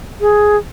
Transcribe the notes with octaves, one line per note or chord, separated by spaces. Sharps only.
G#4